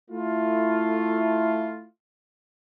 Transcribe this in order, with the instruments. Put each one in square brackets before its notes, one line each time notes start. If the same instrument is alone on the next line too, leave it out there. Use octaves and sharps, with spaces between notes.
[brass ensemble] A3 E4 F4